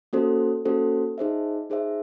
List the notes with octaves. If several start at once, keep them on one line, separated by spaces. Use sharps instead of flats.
A#3 C#4 F#4 A4 C5
A#3 C#4 F#4 A4 C5
D#4 G#4 C5 E5
D#4 G#4 C5 E5